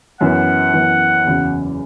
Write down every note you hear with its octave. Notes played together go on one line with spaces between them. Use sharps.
F#2 E3 B3 F#5
F#2 E3 B3
F#1 E2 C#3 F#3